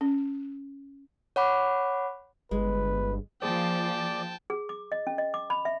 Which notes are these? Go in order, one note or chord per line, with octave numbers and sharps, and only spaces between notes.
C#4
C#5 F#5 B5 D6
G1 G#3 B4
F3 A#3 G#4 C5 D5 G5 A5
G#4
D6
D#5
C#4
D#5
D6
B5
E5